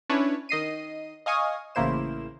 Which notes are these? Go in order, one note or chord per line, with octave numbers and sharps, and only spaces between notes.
C#4 D4 E4 B4 C#5
D#3 D#5 C7 D#7
D#5 F5 G#5 C#6 D#6
A1 C#3 A#3 E4 C5 E7